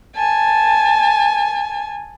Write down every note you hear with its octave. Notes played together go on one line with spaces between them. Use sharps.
G#5 A5